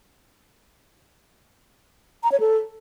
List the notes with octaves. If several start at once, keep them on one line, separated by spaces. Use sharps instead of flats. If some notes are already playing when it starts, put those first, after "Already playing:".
A#5
C#5
A4